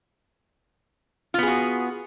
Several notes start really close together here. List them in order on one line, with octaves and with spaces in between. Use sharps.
F4 B3 G#4 F#4